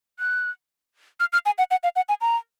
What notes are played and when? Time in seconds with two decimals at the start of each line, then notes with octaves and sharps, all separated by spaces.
0.19 F#6
1.20 F6
1.33 F6
1.46 G#5
1.58 F#5
1.71 F#5
1.83 F5
1.96 F#5
2.09 G#5
2.21 A#5